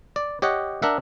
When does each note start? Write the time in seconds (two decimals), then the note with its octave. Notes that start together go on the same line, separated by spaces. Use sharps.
0.16 D5
0.42 G4 C#5 D#5 F#5
0.82 D4 A#4 E5 F#5